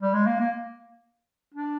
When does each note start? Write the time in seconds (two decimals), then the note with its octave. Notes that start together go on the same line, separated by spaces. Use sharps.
0.02 G3
0.14 G#3
0.26 A#3
0.40 A#3
1.54 D4